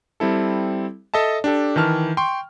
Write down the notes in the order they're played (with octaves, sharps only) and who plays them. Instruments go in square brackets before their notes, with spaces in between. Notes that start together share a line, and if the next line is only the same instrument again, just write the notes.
[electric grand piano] G3 C4 E4 A4
A4 D#5 E5 A5
D4 G4 A4
D#3 E3 A5 F6
G5 C6 C#6